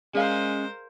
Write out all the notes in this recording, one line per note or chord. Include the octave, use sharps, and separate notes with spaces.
G#3 C#4 G#4 A#4 C5 D5 F5 G#5